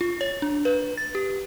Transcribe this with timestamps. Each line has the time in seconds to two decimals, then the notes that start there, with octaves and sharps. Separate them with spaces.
0.01 F4
0.21 C#5
0.42 D4
0.65 B4
0.98 A6
1.15 G4